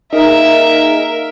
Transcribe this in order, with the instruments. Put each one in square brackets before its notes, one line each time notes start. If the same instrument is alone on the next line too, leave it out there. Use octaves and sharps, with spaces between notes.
[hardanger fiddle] A#3 E5 [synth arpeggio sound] D#4 G#4 [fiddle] A#4